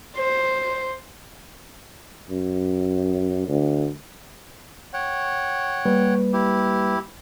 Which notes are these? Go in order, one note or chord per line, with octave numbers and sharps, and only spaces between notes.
C5
F#2
D2
C#5 F#5 G5
G3 A#3 B4
E4 G4